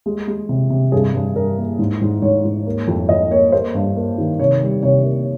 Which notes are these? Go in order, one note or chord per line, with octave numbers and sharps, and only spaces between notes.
G#3
G#3
C3
C3
G2 G#4
G2
G2 A#4
A#3
G#2
G#2
G#2 C#5
G#2
A#3
F2
F2 D#5
A#3 C#5
A#3 C5
G2
A#3
D#3
C3 C#5
G3
C3 C#5
A#3